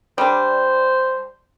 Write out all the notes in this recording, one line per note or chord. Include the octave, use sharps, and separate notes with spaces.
G3 D4 C5